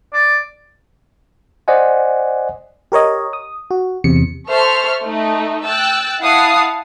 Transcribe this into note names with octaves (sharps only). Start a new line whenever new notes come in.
D5
C5 D5 D#5 F#5 G#5
G4 A#4 C#5 D#5
D#6
F#4
E2 C3 C#7
A4 C5 E5 C#6 F6
A3 D#4
G5 E6 F#6 A6
E4 F5 F#5 A5 D#6 C7